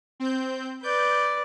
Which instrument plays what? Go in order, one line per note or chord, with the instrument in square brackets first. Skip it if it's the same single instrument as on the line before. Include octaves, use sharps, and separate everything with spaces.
[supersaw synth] C4 G6
[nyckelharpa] B4 D5 [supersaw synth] G6